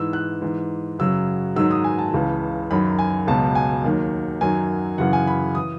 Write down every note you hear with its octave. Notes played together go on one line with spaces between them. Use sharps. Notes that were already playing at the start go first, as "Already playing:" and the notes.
Already playing: G#2 E3 E6
F#6
G#2 E3
F#2 C#3 F#3 E6
G#2 D#3 F#3 E6
D#6
G#5
A5
C#2 C#3 E3
F#2 D#3 F#3 B5
G#5
C#2 B2 F#3 A5
G#5
D#2 D#3 F#3
F#2 D#3 F#3 G#5
F#2 C#3 E3 F#5
G#5
B5
E3 D#6